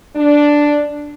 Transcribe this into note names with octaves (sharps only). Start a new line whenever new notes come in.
D4